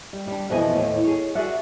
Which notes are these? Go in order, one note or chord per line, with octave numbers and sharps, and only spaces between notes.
G3
G3 D4
F2 B2 E3 F3 D#5 G#5
D#2 A2
G#4 C#5
F#4 G#4 A#4 D5 E5 F#5